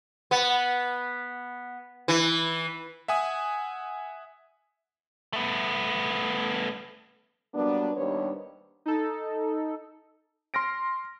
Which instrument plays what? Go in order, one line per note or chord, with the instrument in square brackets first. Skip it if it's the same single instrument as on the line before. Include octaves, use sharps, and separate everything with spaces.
[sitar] B3
E3
[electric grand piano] E5 F#5 G#5 D#6
[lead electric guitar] A3 B3
[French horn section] F#3 G3 A#3 B3 D4
D#2 G3 B3 D4 C5 C#5
[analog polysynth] D#4 A4
[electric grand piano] C6 F6 A#6 D7